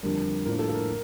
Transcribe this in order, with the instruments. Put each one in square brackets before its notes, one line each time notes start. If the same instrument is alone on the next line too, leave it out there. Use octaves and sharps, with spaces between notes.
[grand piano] F2 D3 G3 D4 A#4
A2 F3 A#3 D4 A#4
A4
A4
A#4